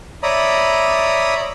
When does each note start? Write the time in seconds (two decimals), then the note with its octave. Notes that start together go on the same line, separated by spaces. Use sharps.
0.23 C#5 D5 E5 A#5 B5 D#6